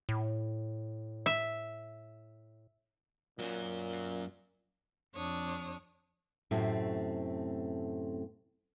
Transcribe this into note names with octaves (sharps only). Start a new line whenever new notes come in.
A2
E5
F#2 A#2 F#3
F2 D4 C#5 D#6
F#2 A2 C3 A3 C4